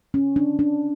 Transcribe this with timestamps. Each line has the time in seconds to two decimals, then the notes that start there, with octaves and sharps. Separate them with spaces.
0.14 C#4
0.36 D4
0.59 D4